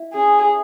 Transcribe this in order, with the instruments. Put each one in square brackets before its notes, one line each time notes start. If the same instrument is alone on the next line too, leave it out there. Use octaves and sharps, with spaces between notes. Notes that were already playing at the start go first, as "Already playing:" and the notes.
Already playing: [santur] E4
[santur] C#4 [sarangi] G#4
[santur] A3